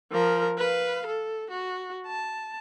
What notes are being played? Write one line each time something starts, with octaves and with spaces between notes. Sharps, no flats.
F3 A#4
B4 F5
A4
F#4
A5